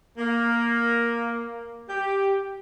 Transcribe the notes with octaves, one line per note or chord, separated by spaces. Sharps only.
A#3
G4